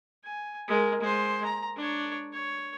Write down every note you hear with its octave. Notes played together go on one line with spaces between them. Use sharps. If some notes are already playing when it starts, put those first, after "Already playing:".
G#5
G#3 A#4
G#3 C5
A#5
D4 C#5
C#5